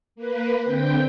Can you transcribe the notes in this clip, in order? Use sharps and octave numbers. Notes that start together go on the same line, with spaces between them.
A#3 B4
D3 C4 G5